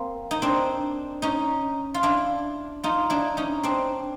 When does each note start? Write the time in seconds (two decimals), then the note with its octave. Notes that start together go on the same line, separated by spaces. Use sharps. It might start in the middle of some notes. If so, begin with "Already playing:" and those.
Already playing: A#3 C4
0.31 D#4
0.42 C4 D4
1.22 C#4 D#4
1.94 F4
2.03 D4 E4
2.84 D#4 F4
3.10 D4 E4
3.37 C#4 D#4
3.63 C4 D4